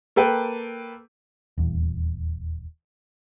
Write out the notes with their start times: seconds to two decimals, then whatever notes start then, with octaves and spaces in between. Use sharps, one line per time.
0.16 A#3 A4 B4 G5
1.58 D#1 E2